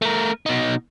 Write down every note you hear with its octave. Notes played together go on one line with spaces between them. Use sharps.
A3 A#4
B2 D#4